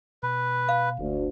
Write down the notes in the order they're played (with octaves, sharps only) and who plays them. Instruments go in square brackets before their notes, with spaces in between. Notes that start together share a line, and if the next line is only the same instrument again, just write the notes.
[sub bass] B2 [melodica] B4
[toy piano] F5
[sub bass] F#1 [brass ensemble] D2